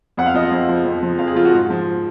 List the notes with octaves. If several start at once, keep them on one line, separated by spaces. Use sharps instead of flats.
F2 F#5
F5
F3 D#5
F5
F2
F3
F2
F3
F2 F5
G#4
F3 F4
F#4
G#2
F3